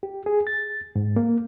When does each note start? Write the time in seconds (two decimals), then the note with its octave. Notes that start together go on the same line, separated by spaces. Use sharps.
0.03 G4
0.26 G#4
0.47 A6
0.96 G#2
1.16 A#3